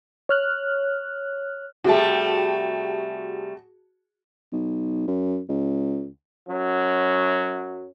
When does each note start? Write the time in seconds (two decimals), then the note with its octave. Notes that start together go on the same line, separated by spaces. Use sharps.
0.29 C#5 F6 F#6
1.84 C3 G3 A3 F#4 G#4 A5
4.52 B1
5.08 F#2
5.49 C#2
6.48 F#2 F#3 C#4